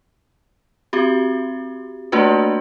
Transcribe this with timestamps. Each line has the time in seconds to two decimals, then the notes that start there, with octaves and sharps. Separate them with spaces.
0.93 C4 F#4 G4
2.12 A3 A#3 D4 F4 F#4 B4